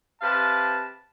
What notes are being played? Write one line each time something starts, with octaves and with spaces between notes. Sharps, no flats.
C3 B4 F5 A5